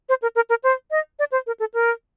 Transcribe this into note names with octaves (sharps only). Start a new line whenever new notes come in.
C5
A#4
A#4
A#4
C5
D#5
D5
C5
A#4
A4
A#4